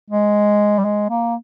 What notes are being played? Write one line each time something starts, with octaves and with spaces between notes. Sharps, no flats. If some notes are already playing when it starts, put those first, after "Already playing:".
G#3
G3
G#3
A#3